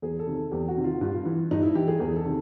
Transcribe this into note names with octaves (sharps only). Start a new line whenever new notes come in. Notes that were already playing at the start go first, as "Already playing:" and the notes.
E2 G#4
A4
C3 D#3
A4
E2 G4
F#4
C3 D#3
F4
G2 F4
E3
G2 D#4
E4
E3 G4
G#4
E2 G#4
A4
C3 D#3